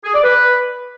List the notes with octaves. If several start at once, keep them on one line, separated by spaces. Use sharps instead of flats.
G#4
D5
B4